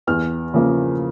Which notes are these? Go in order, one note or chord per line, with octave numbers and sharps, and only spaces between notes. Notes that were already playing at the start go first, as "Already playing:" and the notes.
E2 F6
C#3 F3 A#3